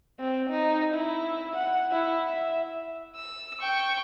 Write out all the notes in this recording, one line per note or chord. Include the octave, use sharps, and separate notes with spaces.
C4
D#4
E4
F#5
E4
E5
E6
G5 C#6